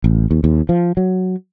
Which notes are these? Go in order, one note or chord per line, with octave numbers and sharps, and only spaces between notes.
A1
D#2
D#2
F3
F#3